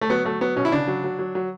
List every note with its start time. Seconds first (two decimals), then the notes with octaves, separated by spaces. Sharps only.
0.01 A3
0.10 F#3 B3
0.25 F#3 A3
0.41 F#3 B3
0.56 B2 C#4
0.65 E4
0.72 C#3 D4
0.87 F#3
1.04 F#3
1.19 F#3
1.35 F#3